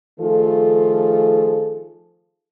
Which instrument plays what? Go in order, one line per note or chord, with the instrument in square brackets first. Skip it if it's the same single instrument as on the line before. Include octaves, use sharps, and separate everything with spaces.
[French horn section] D#3 F3 A3 F4 G#4 A4